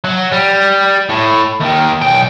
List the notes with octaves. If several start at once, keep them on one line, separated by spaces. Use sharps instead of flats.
F#3
G3
A2
D#2 D#3
B1 G5